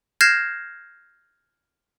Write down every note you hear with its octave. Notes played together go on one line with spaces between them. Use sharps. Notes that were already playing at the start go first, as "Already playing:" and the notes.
F6 G6 G#6 A#6 C7 E7